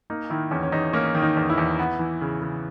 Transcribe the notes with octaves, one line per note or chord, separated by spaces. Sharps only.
A#3 D#4
D#3 E4
E2 C#4
C#4
E2 D#4
A#3 C#4
D#3
D#4
E2
E4
E2
B3
E3
C#3
C#3